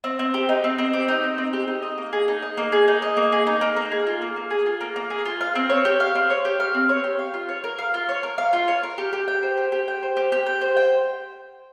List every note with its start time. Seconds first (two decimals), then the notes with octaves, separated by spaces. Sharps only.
0.04 C4
0.19 C4
0.34 G4
0.49 D#4
0.64 C4
0.78 C4
0.93 G4
1.08 D#4
1.24 C4
1.38 C4
1.53 G4
1.68 D#4
1.82 D#5
1.98 A#3
2.13 G#4
2.28 D#4
2.42 D#5
2.57 A#3
2.72 G#4
2.88 D#4
3.02 D#5
3.17 A#3
3.32 G#4
3.47 D#4
3.61 A#3
3.76 A#3
3.92 G#4
4.07 F4
4.22 A#3
4.36 A#3
4.50 G#4
4.66 F4
4.81 A#3
4.96 A#3
5.10 G#4
5.25 F4
5.41 F5
5.55 C4
5.70 C#5
5.85 G4
6.00 F5
6.15 C4
6.30 C#5
6.45 G4
6.60 F5
6.74 C4
6.89 C#5
7.04 G4
7.19 F5
7.34 F4
7.49 C#5
7.64 A#4
7.78 F5
7.94 F4
8.09 C#5
8.23 A#4
8.38 F5
8.53 F4
8.68 C#5
8.83 A#4
8.98 G4
9.13 G4
9.28 G5
9.43 C5
9.57 G4
9.72 G4
9.88 G5
10.03 C5
10.17 G4
10.32 G4
10.46 G5
10.61 C5
10.77 G5